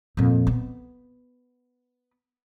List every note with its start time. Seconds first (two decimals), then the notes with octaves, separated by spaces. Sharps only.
0.17 F2 A#2
0.47 B3